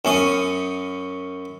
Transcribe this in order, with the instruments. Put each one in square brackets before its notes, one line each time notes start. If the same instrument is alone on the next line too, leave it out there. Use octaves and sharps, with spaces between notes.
[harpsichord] F#2 C#4 D#6